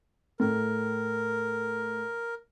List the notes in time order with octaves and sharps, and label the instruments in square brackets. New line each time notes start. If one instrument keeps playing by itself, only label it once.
[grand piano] A2 [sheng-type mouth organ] A#4